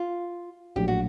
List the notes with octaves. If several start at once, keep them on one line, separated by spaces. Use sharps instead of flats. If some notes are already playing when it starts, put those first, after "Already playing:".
Already playing: F4
A#1 A2 F#3 G4
F#4